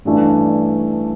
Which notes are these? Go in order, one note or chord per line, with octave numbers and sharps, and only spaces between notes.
A1 G2 E3 A3 D4